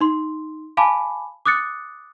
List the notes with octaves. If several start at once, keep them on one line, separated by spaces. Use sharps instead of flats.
D#4 C6
F5 G#5 A5 B5 D6
D6 D#6 F#6 A6 C#7